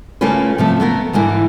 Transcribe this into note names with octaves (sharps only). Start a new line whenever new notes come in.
C#3 A3 A#3 C#4 F4 B4
C3 F3 A3
A3 B3 A#4
G#2 D3 E3 A#3